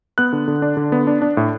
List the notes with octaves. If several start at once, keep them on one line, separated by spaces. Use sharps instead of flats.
B3 F#6
D3
D3
D4
D3
B3
D4
D4
A2